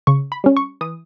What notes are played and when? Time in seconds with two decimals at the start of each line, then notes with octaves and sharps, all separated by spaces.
0.07 C#3 C#6
0.32 B5
0.44 G3 C#4
0.57 C#6
0.81 E3 D#6